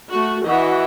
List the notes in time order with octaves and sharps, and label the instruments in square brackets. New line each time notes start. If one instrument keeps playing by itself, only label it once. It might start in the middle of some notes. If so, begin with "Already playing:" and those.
[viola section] A3 F#4
[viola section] E3 D#5 E5 [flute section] F#4